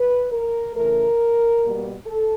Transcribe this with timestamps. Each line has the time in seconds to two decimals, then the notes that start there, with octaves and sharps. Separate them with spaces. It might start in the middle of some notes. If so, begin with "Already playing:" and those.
Already playing: B4
0.33 A#4
0.75 C#3 E3 A3 A#4
1.63 B2 G3 A#3
2.06 A4